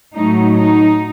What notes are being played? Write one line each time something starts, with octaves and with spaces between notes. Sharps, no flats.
A2 F#3 A3 D#4
D#4